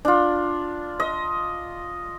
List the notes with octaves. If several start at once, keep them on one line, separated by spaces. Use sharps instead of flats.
D4 F4
D#5